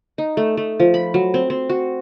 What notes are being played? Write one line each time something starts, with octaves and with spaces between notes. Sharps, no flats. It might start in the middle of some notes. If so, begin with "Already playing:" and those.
D#4
A3
A3
F3
B5
F#3
C4
C4
F#4